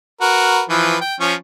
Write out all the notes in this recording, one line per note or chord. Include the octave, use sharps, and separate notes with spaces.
F#4 A#4 B4
E3 F3 B4
G5
F3 C#4 C#6